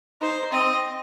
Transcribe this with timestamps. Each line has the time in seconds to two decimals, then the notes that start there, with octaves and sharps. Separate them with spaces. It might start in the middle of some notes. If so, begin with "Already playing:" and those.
0.21 D#4 C5
0.52 C4 D#5